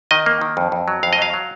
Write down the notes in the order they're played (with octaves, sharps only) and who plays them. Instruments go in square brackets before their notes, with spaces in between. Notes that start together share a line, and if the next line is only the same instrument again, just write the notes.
[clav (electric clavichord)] D#3 D#5
A#3
D#3
F2
F2
F#3
F2 F5
D#5
F#3 F5
F#3